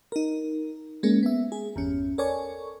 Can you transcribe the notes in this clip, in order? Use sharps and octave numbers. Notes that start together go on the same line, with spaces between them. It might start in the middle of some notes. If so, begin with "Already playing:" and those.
D#4 A#4
G#3 A#3 C#4
B3 E5
G#4
G1 E2 C#4
A4 A#4 C#5 D5 G#5 C#6